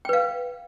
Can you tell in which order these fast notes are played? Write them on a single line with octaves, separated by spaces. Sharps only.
G5 B4 F5